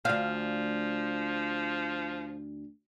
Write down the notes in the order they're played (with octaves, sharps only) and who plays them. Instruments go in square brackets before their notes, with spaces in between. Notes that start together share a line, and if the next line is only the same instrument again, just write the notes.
[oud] D2 F5 [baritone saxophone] F3